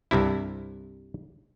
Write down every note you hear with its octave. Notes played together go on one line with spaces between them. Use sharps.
C2 G2 C3 E4